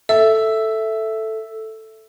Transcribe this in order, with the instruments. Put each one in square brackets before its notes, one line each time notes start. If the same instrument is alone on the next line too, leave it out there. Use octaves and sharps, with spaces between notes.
[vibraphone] A4 [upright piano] E5